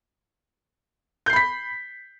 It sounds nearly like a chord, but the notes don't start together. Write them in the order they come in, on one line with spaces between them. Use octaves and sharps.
G6 C7 B5 B6